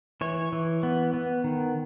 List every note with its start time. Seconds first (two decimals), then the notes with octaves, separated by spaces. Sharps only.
0.21 E3 C#5
0.53 E3
0.83 B3
1.14 B3
1.44 D#3